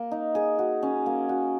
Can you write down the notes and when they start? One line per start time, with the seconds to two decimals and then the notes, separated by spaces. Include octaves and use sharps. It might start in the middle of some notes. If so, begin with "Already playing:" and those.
Already playing: A#3
0.11 D#4
0.35 G#4
0.59 F#4
0.83 C#4
1.06 A#3
1.29 F#4